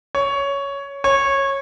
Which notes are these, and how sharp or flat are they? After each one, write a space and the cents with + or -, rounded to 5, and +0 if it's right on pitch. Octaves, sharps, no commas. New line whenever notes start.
C#5 +10
C#5 -15